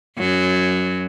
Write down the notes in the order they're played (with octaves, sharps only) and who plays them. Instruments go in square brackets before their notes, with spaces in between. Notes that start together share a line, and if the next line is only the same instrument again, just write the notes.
[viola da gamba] F#2 F#3